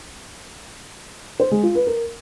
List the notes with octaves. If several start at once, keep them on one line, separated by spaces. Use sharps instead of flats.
C5
G#3
F4
B4
A#4